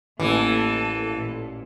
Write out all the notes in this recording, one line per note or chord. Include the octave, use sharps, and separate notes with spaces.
A1 E3 A#3 A4
A#2